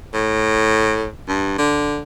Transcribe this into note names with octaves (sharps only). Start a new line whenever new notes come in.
A2
G2
D3